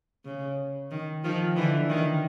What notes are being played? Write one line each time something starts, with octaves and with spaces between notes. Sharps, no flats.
C#3
D#3
D#3 F3
D3 E3
D#3